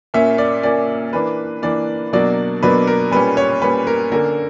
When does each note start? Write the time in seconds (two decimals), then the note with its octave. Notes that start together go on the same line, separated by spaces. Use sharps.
0.14 A#2 A#3 C#4 E5
0.38 D5
0.63 A#2 A#3 C#4 D5
1.13 E3 A#3 D4 B4
1.63 E3 A#3 D4 D5
2.13 B2 F#3 A#3 D4 D5
2.63 B2 F#3 A#3 D4 B4
2.87 A#4
3.12 A#2 G3 C#4 B4
3.37 C#5
3.62 A#2 G3 C#4 B4
3.87 A#4
4.11 D3 A#3 C#4 A#4